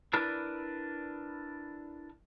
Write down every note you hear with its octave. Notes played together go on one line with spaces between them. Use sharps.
D4 E4 A#4 B4 D5